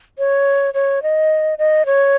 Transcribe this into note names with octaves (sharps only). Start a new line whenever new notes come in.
C#5
C#5
D#5
D#5
C#5